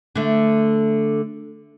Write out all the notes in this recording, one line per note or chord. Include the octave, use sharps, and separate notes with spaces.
D3 A3